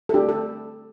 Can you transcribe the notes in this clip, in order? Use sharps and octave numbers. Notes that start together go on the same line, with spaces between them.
A4
A3 D4 G4
A4